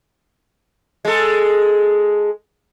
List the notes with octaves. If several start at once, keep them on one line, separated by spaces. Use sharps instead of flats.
G#3 A4